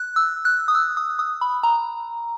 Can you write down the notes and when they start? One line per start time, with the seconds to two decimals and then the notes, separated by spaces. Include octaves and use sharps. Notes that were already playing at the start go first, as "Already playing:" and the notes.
Already playing: F#6
0.16 E6
0.45 F#6
0.68 D#6
0.75 E6
0.97 D#6
1.19 D#6
1.41 B5
1.63 A#5